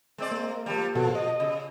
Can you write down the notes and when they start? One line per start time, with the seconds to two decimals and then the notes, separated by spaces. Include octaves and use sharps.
0.18 G#3 C4 D5
0.32 A#3
0.66 F3 G3
0.95 B2 F3 F#4 A4
1.15 D#5
1.40 C#3